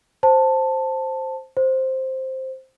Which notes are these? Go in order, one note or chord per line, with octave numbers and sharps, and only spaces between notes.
C5 A5
C5